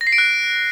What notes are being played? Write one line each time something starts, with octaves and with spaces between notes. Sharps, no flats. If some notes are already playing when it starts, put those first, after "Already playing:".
A#6
C7
D7
F#6